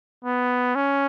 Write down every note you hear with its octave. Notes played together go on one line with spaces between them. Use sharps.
B3
C#4